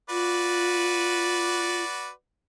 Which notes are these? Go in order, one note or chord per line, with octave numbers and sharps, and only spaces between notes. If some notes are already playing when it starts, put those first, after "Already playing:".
F4 F#4 B4 D5